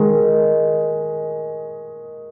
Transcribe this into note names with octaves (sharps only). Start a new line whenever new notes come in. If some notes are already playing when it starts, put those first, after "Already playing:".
Already playing: D#3 G#3